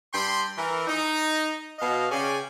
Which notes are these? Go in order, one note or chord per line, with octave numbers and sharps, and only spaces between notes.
G2 G5 B5 C6
E3 A#4
D#4
B2 D#5 F5
C#3 C#4 G#4 D5 G5 G#5